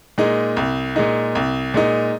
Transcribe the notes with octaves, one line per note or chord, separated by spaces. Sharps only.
A#2 G#3 D#4
C2
A#2 G#3 D#4
C2
A#2 G#3 D#4